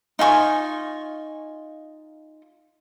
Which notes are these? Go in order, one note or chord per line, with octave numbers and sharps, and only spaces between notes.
D#4 F4 G#5 C#6